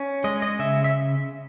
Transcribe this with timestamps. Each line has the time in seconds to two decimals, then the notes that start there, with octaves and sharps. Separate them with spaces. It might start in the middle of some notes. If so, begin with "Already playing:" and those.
Already playing: C#4
0.24 G#3 D#5
0.42 D#5
0.59 C#3 E5
0.84 E5